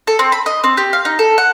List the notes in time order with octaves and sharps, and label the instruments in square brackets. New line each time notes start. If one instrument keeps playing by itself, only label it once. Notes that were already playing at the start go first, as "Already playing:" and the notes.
[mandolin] A4
C4
B5
D#5
C4
G4
F5
D#4
A4
F#5